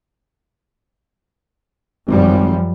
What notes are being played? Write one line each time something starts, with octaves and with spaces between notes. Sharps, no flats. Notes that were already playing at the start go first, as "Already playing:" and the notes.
G#1 F#2 F3 G3